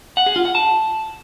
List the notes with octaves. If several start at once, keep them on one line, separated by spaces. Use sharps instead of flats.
F#5
G#4
F4
F#5
A5